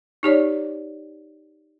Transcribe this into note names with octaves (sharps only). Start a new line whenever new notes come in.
D#4 G4 C#5 D5